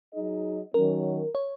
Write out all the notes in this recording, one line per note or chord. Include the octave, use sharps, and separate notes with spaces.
F#3 D#4 G#4 D#5
D#3 F#3 C#4 A#4
C#5